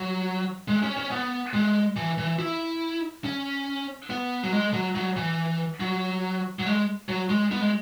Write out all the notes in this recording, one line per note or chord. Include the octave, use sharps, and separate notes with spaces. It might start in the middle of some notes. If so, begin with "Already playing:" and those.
Already playing: F#3
G#3
C#4
C#4
B3
G#3
E3
E3
E4
C#4
B3
F#3
G#3
F#3
F#3
E3
F#3
F#3
G#3
F#3
G#3
B3
G#3